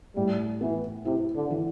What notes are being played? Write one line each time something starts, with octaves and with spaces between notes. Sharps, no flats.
A2 G3
E3 B3
C3 E4
D3
E3